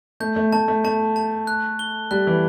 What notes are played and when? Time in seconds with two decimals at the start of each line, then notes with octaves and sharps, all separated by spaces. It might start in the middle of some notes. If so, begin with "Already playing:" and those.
0.20 A3 G6
0.36 A3
0.53 A3 A5
0.68 A3
0.84 A3 A5
1.16 A5
1.47 F#6
1.79 G7
2.11 G3 F#6
2.27 E3